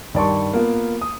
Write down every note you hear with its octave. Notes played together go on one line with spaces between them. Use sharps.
G2 D#3 D5 A5 C6 C#6
A#3 B3 F4
D#6